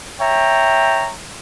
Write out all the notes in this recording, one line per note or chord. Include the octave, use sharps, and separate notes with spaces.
C#5 E5 G5 A#5